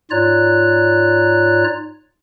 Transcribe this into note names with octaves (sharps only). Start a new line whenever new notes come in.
G#2 F4 C#5 D5 A#5 F#6